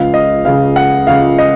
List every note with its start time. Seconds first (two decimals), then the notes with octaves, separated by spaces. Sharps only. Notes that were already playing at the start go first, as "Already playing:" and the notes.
Already playing: C#2 C#3 F3 F5
0.14 D#5
0.45 C#2 C#3 F3 F5
0.76 F#5
1.07 C#2 C#3 F3 F5
1.38 D#5